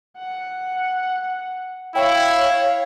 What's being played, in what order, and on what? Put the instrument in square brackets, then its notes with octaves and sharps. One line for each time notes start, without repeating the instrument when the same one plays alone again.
[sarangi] F#5
[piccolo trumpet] E4 [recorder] C#5 [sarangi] F5 [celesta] G5